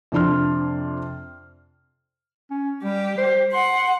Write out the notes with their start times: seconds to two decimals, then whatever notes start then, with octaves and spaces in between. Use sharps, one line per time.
0.12 F2 C3 D4 C6 F6
2.51 C#4
2.84 G3 G4
3.18 C5
3.53 F#5 C6